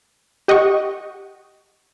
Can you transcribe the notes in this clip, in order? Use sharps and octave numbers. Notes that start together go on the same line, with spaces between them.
G4 D#5 F#5 G5 C#6